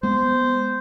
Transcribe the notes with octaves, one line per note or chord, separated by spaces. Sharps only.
G#3 B3 C5